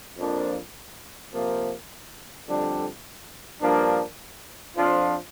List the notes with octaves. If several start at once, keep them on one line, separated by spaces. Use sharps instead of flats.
F2 F3 A#3 D4
C3 F3 A#3
F2 D3 G3 D4
G2 F3 A#3 D4
F2 F3 D4 F4